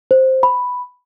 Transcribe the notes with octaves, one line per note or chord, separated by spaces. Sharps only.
C5
B5